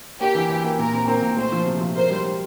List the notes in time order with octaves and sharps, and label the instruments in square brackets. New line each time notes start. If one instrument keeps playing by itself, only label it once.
[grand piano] A#3 [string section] G4
[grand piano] E3
E3
A#3
[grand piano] A#2 [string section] A#4
[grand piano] C4
[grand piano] C4 [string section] A#4
[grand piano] A#2
[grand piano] A3 [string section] C5
[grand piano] F3
C3
F3
[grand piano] A#4 [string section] C5
[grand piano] G3
G3